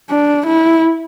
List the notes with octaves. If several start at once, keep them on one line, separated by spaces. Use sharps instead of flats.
D4
E4